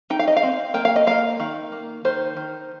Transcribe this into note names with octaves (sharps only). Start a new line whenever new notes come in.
D#4 G5
F5
D#5
F5
C4
A#3 G5
F5
D#5
A#3 F5
D#3
A#3
D#3 C5
D#3